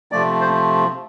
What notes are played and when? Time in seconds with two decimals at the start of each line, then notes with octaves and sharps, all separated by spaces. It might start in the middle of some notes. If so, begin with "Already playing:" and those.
0.12 C3 F3 A3 D5
0.41 C5